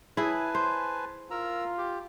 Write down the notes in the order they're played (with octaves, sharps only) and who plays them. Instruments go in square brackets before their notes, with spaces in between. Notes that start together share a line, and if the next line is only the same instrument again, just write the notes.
[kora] E4 G#4 [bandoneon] B4 G#5 A5
[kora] C5
[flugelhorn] F4 [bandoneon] A#4 A#5 E6
[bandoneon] G4